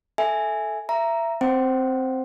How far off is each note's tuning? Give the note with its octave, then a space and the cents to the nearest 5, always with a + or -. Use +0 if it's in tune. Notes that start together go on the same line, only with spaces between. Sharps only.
A4 +0 E5 +0 G#5 +0
E5 +25 A#5 +0
C4 +0 C5 +0 G5 -45